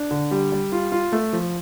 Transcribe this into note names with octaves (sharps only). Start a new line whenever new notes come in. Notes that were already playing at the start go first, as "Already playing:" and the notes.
Already playing: D4
D3
G3
G3
F4
F4
A3
F3